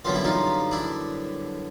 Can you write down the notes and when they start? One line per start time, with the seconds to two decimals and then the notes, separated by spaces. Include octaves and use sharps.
0.05 F#2 D3 G3 B3 F4
0.15 E4
0.25 D#4 F4
0.71 D4 E4